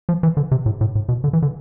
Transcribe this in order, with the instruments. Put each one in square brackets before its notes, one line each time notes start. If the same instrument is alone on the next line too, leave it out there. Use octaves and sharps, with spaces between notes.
[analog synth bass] F3
E3
D3
C3
A2
A2
A2
B2
D3
E3
D3